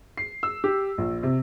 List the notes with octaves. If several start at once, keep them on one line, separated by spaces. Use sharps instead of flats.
C7
E6
G4
A#1
C3